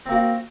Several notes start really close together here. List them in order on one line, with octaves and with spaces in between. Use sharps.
C4 A#3 F#4